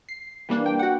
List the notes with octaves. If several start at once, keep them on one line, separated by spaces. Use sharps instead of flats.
C7
E3 G3 A#3 D4
G5
F#4 F#5